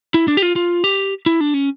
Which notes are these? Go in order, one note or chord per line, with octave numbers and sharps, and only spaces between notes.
E4
D4
G4
F4
F4
G4
E4
D4
C#4